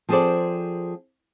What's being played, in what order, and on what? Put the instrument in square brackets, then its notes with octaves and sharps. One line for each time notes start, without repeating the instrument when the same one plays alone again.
[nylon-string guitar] F3 C4 G#4 A4 C5 D5